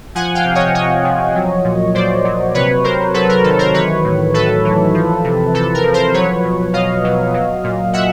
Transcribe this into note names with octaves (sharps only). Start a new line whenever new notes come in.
F3 F#5 G#5
F5 G5
C3
C#5 D#5
C3 C#5 D#5
F3
F#3
A#2
A#2 C5 D5
F#3
C3 B4 C#5
C3 A#4 C5
F#3 A4 B4
A#4
D#3 A4
A#4 C5
E3 B4 C#5
A2
A2 A4 B4
E3
F3
C3
C3 A4
A#4
F3
A#4 C5
F#3 B4 C#5
B2
B2 D#5 F5
F#3
F#3
A#2
A#2 E5 F#5